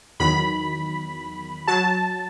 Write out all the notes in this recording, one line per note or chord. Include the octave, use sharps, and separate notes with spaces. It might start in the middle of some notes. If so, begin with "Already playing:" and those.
E2 D#3 F#3 B5
F#3 A5